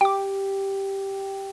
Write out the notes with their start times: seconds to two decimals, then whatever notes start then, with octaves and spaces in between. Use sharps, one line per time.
0.01 G4 G5 D6